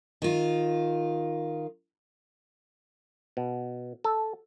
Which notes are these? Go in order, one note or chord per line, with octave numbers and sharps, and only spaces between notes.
D#3 F4
B2
A4